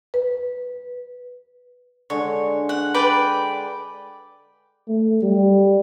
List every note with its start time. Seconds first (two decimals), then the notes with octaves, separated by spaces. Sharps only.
0.14 B4
2.10 D3 G#3 C#5
2.69 F#5
2.94 B4 D5 G5
4.88 A3
5.22 G3